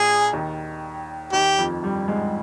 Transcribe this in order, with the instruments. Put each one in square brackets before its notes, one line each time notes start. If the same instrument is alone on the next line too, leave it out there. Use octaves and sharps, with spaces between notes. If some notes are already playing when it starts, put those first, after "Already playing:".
Already playing: [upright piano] A#1 A#2 [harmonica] G#4
[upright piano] D#2 D#3
[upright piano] D#2 D#3 [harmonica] G4
[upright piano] F2 F3
G2 G3
G#2 G#3